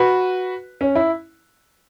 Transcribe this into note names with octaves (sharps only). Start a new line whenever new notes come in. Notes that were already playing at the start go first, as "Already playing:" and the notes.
Already playing: F#4 B4
C#4
E4